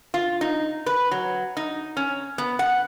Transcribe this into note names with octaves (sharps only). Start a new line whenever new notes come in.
F4
D#4
B4
F#3
D#4
C#4
B3
F#5